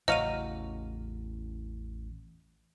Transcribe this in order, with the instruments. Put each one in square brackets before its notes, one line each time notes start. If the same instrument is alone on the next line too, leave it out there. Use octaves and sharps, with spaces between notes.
[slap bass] A1 E2 C#3 [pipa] F#3 F5 [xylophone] D#5 D#7